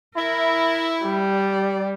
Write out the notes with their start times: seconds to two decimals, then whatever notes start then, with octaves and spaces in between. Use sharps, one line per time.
0.17 E4 A#4
1.04 G3 D5